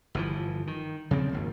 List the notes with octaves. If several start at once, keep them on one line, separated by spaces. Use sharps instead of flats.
G1 E3 F3
D#3
C#3 F3 C4
G#1 D#2